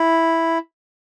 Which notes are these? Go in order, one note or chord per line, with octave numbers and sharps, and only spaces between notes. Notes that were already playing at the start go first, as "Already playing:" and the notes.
Already playing: E4